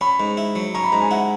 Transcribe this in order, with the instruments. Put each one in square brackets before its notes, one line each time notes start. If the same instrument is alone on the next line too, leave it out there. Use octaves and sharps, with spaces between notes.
[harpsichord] C#4 [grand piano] B5
[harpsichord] G#2
E4
F#3
[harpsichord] C#4 [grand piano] A#5
[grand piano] B5
[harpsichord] G#2 [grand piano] A#5
[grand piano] G#5
[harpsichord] E4 [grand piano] F#5